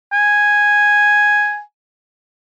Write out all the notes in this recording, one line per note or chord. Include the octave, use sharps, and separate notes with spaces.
G#5